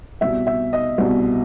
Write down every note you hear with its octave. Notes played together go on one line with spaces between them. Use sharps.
C2 B2 E5
E5
D#5
C2 B2